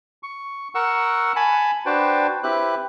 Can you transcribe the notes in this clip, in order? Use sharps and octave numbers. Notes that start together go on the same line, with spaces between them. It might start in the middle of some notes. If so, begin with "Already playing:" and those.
C#6
A#4 F#5 C#6 E6
G#5 A5 B5
D4 F#4 B4 C5 G5 A5
C4 E4 G4 B4 F#6